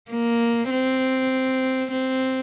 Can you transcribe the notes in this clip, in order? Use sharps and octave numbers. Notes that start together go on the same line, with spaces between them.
A#3
C4
C4